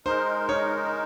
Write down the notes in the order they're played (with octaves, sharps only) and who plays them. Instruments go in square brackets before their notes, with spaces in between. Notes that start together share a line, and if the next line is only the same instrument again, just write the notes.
[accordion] G#3 D#4 A#4 [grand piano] C5
[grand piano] C#5